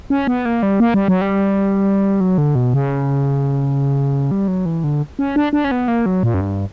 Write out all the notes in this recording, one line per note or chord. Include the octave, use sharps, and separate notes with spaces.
C#4
B3
A#3
G3
A#3
G3
F#3
G3
F#3
D3
B2
C#3
G3
F#3
E3
D3
C#4
D4
D4
C#4
B3
A#3
F#3
A#2
F#2
G2